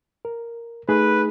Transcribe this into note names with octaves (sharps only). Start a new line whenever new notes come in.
A#4
A3 D#4 G#4 B4